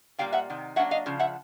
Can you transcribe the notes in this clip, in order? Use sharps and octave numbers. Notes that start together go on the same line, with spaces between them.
A#2 G3 A#3 F5 G5
E5 F#5
C3 D#3
F#3 A#3 D4 E5 F#5
D#5 F5
C#3 F3
E5 F#5